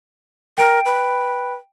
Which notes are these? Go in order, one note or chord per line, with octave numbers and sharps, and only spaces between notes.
A#4 G5 D7
B4